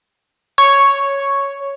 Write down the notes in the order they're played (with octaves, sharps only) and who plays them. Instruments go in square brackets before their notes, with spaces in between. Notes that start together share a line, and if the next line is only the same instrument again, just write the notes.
[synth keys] C#5